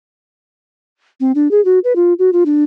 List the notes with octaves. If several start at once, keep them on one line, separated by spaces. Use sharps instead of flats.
C4
D4
G#4
F#4
B4
F4
F#4
F4
D4